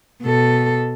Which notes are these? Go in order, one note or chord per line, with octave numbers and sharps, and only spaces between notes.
B2 A4